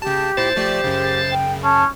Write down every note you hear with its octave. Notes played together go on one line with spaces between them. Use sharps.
C#3 G4 A5
A#2 E4 C5 A6
F3 A3 G4 D5
F#2 C#3
G5
C#4 A5